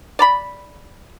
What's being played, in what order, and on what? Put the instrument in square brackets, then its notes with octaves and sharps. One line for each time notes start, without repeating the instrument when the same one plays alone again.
[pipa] D5 A#5 B5